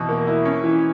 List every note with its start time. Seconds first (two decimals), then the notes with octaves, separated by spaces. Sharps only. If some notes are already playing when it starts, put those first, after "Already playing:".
Already playing: E2 B2 E4
0.09 A#3
0.27 E4
0.45 C#4
0.64 E3